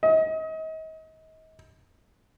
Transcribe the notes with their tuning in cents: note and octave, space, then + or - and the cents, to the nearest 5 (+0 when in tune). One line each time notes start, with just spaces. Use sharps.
D#5 +35